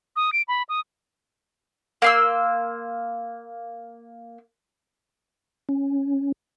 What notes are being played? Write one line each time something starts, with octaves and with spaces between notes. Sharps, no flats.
D#6
D7
B5
D#6
A#3 C6 E6
C#4